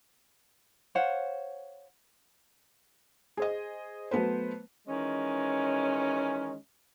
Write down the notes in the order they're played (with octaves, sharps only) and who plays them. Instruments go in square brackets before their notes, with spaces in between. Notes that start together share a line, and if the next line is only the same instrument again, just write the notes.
[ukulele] C5 C#5 F5 F#5
[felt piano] G#4 C5 D#5
F#3 A3 B3 B4 C5
[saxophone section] D#3 E3 G#3 C#4